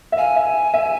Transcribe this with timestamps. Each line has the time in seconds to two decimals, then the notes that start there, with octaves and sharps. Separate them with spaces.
0.12 E5
0.18 F5 G#5
0.36 E5
0.74 E5